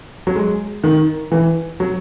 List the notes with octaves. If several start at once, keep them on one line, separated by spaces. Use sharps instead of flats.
F#3
G#3
D#3
E3
F#3